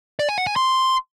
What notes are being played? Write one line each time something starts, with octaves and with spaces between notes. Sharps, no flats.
D5
G#5
F#5
G#5
C6